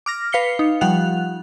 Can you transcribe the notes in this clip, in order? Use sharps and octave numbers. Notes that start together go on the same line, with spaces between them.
D6 F6 A#6
B4 F5 C7 C#7 G7
D#4
F3 G3 F#5 F#6 F7